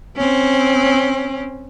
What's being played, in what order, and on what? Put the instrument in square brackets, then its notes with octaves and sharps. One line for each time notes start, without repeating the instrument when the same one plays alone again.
[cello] C4 C#4